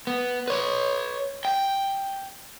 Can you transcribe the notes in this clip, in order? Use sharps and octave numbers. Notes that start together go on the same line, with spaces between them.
B3
B4 C#5
G5